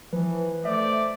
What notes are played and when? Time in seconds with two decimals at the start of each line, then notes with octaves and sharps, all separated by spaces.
0.13 E3 F3 B4
0.65 A3 C5 D5 E5